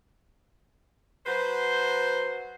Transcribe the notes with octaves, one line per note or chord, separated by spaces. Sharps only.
F#3 B4 C5